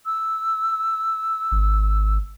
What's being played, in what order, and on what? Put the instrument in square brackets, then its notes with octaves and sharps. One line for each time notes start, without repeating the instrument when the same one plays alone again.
[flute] E6
[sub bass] G#1